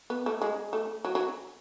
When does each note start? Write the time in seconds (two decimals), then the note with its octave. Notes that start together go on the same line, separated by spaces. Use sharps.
0.10 B3
0.26 A3
0.42 G#3
0.73 A3
1.05 F#3
1.15 F#3